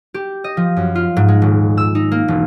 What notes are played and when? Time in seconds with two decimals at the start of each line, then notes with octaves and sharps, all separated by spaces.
0.14 G4
0.44 D#5
0.57 F3
0.77 F#2
0.95 F4
1.17 G#2
1.28 G#3
1.42 D#1
1.78 E6
1.95 D#4
2.12 A#3
2.28 E1